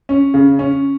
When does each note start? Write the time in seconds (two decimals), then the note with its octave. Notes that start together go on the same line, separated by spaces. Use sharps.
0.09 C#4
0.34 C#3
0.59 C#4